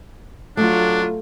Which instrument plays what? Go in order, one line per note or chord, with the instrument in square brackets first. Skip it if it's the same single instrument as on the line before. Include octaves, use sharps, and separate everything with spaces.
[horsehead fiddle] F#3 F4 [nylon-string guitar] A3 [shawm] D4